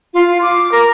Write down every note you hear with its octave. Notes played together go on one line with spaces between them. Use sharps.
F4
D6
A#4